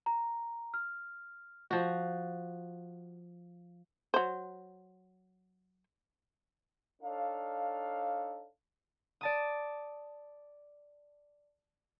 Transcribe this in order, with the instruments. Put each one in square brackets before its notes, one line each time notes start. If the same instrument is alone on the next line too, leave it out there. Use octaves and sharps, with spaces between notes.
[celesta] A#5
F6
[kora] F3 F#4
[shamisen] F#3 C5
[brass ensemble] D4 D#4 A4 C#5 F5
[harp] D5 A5 D#6